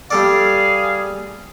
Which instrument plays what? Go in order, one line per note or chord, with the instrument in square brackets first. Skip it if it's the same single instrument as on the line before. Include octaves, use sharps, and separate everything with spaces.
[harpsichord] G3 A4 D5 [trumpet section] G#4 F5